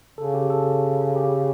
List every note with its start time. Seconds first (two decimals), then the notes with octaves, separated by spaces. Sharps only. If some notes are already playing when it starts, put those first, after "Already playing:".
0.18 C#3 A4
0.34 G4
0.50 A4
1.16 G4